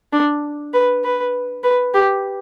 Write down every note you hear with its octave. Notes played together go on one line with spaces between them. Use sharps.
D4
B4
B4
B4
G4